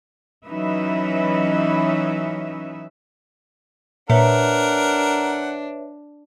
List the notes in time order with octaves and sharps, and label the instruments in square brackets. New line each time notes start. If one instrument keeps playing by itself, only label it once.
[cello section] E3 F#3 C#4 D#4 B4 E5
[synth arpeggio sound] A#2 [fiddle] D4 [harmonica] A#4 F#5 [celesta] B4 C#5 E5